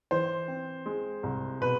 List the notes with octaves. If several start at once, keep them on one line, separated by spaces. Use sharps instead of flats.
E3 C5
C4
G#3
C2
B2 B4